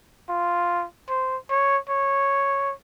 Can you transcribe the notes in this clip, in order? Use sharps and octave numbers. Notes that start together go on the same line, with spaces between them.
F4
C5
C#5
C#5